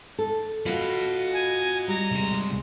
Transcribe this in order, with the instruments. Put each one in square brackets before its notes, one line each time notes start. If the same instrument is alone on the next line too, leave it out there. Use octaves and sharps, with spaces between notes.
[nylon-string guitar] A4
[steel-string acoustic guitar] F4 F#4 F5 [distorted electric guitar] D#5 B5
[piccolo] G#5
[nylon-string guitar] G3 [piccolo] A#5
[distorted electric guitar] C2 G#3